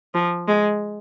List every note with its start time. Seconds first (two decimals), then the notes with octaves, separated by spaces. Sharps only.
0.14 F3
0.48 G#3